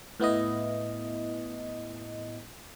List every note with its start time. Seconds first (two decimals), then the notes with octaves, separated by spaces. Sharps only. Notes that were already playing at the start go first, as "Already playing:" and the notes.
0.20 A2 B3 E4 D#5